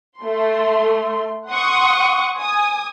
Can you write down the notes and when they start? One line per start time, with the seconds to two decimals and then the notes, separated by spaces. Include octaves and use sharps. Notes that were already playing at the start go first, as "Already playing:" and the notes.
0.20 A3 C6
1.50 F#5 C6 C#6 D#6
2.39 G#5 D#6